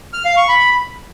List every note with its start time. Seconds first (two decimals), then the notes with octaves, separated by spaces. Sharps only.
0.13 F6
0.25 F5
0.37 C#6
0.48 B5